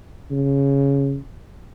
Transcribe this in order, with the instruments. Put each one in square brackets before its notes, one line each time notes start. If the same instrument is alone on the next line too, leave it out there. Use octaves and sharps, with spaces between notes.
[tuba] C#3